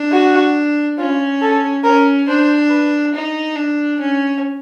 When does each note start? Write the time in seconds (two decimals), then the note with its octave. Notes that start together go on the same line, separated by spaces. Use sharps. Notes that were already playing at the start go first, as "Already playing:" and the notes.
Already playing: D4
0.12 F#4
0.98 C#4 F4
1.41 A4
1.84 C#4 A#4
2.28 D4 C5
2.70 B4
3.14 D#4
3.56 D4
4.00 C#4